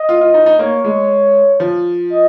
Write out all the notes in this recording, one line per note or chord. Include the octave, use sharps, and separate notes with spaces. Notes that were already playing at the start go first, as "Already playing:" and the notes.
Already playing: D#5
F4
F4
D#4
D#4
A#3 C#5
G#3 C#5
F3
D#5